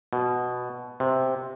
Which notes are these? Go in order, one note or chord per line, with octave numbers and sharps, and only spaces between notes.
B2
C3